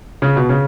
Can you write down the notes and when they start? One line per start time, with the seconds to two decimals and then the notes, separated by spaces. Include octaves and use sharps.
0.22 C#3
0.36 B2
0.49 C#3